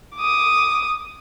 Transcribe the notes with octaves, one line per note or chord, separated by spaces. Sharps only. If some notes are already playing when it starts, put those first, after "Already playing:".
D6 D#6